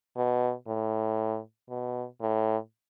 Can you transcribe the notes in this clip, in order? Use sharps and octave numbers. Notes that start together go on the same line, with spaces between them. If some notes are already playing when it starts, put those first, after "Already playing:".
B2
A2
B2
A2